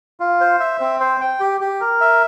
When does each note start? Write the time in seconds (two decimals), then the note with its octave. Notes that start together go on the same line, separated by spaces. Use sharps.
0.20 F4
0.40 C5
0.60 E5
0.80 C4
1.00 C5
1.21 G5
1.40 G4
1.61 G4
1.81 A#4
2.01 E5